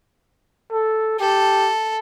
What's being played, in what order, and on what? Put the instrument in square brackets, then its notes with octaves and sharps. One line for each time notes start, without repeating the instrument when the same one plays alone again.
[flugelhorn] A4
[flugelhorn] G4 [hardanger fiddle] A4